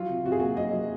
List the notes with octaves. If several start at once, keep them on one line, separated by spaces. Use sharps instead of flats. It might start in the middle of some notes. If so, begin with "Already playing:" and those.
Already playing: F#3 F4
C3
C3 F#4
G#4
A#3 F#4
F#3 D#5
F#3